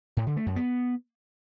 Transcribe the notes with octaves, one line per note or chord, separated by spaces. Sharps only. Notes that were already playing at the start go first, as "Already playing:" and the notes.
A2
D3
A3
F#2
B3